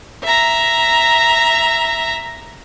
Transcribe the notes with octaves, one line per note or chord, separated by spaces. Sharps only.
E5 A#5